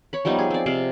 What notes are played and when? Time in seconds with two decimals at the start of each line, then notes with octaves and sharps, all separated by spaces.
0.13 C#5 B5
0.25 F3 G3 B3 D#4
0.38 G#4
0.50 C4 D5
0.66 C3 D5 F5